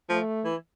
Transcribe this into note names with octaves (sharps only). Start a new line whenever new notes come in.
F3 A3
E3